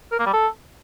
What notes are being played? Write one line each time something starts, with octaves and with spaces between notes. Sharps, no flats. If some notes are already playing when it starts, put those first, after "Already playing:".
A#4
A#3
G3
A4